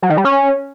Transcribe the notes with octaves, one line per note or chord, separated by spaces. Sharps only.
F#3
D#3
G3
C#4